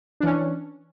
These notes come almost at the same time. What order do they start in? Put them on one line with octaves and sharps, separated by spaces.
D4 E3 C#4